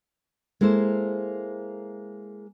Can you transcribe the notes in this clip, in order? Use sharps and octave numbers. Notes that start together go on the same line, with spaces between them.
G#3 A#3 E4 A4 C5